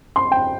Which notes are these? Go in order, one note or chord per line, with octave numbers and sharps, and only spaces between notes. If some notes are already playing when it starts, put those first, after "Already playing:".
C6
G5